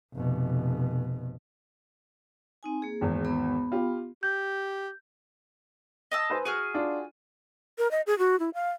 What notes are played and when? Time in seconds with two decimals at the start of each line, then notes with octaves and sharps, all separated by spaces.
0.13 F1 B2
2.63 C4 D#4 G#5
2.82 A#3 G#4
3.01 G#1 E2
3.25 B3 B5
3.72 F4 G4
4.23 G4 G6
6.11 D#5 A5 E6
6.30 B4 C5 G#5
6.45 F#4 G#4 F6 D#7
6.74 D4 F4
7.78 A#4
7.91 D#5
8.07 G#4
8.19 F#4
8.39 E4
8.54 F5